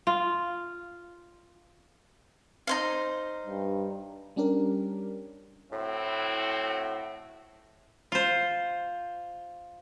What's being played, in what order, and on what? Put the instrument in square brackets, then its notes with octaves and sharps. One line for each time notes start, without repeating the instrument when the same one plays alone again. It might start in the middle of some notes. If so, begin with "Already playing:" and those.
[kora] F4
[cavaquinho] D#4 C5 F5
[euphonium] G2
[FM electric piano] G3 C#4 D4 G4 A#4
[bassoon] A2 [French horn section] C4 E4 F#4
[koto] F4 C5